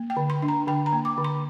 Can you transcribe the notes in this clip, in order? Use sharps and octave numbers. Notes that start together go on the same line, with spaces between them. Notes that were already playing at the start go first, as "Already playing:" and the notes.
Already playing: A#3
G5
D3
C6
D4
A#5
D3 G5
A#5
A#3
D6
D3
C6